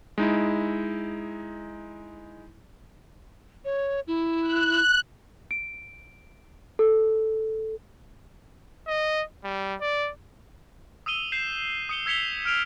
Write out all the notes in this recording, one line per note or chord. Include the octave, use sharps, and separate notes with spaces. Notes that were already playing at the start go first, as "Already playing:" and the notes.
G#3 D#4 E4
C#5
E4
F#6
D7
A4
D#5
G3
D5
D#6 E6 D#7 G7
G6 C7 E7
D#6 C#7 G7
E6 G#6 B6 C#7 F7 G7
F6 D7 F7